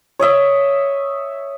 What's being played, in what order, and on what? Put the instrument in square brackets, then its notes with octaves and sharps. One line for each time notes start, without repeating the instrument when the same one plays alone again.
[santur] C#5 D#5 E5